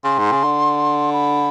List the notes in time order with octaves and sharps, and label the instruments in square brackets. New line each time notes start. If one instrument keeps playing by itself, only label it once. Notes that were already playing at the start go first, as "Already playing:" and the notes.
[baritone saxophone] C#3 [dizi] C6
[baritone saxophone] G#2
C#3
D3
[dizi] B5